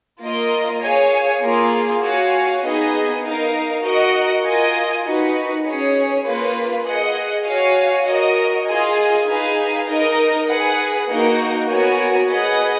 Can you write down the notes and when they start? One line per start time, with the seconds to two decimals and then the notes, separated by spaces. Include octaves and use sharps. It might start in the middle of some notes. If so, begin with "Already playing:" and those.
0.20 A#3 F4 A#4 D#5
0.81 G#4 C#5 F5 G#5
1.41 A#3 F4 G#4
2.02 F#4 C#5 F5 G#5
2.62 B3 D#4 G#4 D#5
3.22 D#4 A#4 F5
3.83 F#4 A#4 D#5 F#5
4.43 F4 A#4 D#5 G#5
5.04 D#4 F#4 B4
5.64 C#4 G#4 C#5
6.25 A#3 F4 B4
6.85 G#4 D#5 F#5
7.45 F#4 C#5 F5 G#5
8.05 F#4 A#4 D#5
8.66 F4 G#4 D#5 G#5
9.27 D#4 G#4 B4 F5 G#5
9.87 D#4 A#4 D#5
10.47 G#4 B4 F#5
11.08 A#3 D#4 F#4 A#4
11.69 B3 F#4 A#4 C#5 G#5
12.29 G#4 B4 D#5 F#5